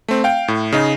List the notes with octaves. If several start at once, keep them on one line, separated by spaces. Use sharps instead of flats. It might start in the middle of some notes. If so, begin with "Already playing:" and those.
A3 C4
F5 G5
A2
C#3 D#4